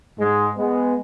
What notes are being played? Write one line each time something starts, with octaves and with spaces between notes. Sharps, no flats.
G#2 G#3
G#3 B3